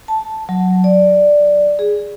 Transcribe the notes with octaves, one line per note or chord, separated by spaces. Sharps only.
A5
F#3
D5
G#4